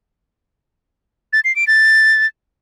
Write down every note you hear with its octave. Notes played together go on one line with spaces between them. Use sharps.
A6
C7
D7
A6